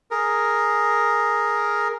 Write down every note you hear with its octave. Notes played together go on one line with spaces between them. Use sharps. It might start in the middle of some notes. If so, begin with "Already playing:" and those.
G#4 A#4